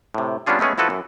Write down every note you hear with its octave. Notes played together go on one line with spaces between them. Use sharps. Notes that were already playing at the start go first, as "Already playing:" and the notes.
A2 C3
G3 B3 C#4 D4 F4 G#4
G#3 A3 B3 C#4 G#4
F3 E4 F#4 A4 B4
F#2